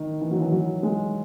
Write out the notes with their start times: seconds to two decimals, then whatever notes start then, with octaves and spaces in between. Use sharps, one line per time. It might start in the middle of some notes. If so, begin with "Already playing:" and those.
Already playing: D#3
0.21 E3
0.31 F#3
0.40 E3
0.52 F#3
0.83 G#3